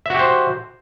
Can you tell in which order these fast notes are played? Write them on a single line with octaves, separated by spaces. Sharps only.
E5 F#4 G4 C5